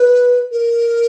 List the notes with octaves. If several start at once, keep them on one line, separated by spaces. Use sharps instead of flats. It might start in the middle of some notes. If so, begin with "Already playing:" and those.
Already playing: B4
A#4